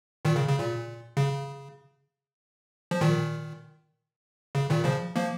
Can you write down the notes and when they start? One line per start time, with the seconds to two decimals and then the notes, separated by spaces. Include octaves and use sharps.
0.25 A#2 D#3
0.36 C#3
0.48 C#3
0.59 A#2
1.17 C#3
2.91 F3
3.01 A#2 D#3
4.55 C#3
4.70 A#2 D#3
4.85 C#3 F3
5.15 F3 A#3